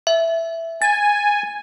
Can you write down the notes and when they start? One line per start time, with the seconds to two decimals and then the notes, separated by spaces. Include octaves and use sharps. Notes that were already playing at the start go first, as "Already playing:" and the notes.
0.07 E5
0.82 G#5 A6